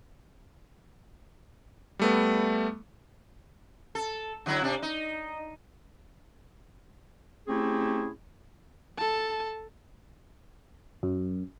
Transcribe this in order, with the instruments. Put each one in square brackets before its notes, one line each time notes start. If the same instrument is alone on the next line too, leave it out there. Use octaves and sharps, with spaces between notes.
[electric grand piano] G3 A3 B3
[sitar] A4
D3 F#3 E4
C3 D4
D#4
[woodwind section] A3 C4 C#4 E4 G4 G#4
[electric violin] A4 A5
[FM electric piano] F#2